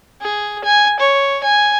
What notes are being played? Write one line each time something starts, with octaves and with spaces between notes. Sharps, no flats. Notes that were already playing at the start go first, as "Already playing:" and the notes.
G#4
G#5
C#5
G#5